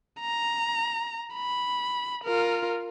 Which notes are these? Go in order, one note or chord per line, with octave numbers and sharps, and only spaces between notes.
A#5
B5
F4 A#4